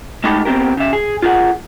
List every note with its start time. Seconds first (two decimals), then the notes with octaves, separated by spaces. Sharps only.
0.24 G#3 A3 D#4 G4 A4 B5
0.45 B3 C4 D4 G4 A#4
0.77 C#3 E5
0.93 G#4
1.22 F4 G#4 A#4 F#5